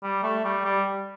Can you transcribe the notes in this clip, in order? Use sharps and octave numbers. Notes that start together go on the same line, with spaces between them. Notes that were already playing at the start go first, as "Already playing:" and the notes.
G3
A3
G3
G3